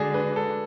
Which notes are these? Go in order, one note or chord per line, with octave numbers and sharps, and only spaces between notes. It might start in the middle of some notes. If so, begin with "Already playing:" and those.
Already playing: D3 G#3 D4 F#4 G#4
B4
A4